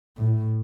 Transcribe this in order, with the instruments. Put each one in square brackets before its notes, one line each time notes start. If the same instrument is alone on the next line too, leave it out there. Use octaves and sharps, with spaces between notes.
[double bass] A2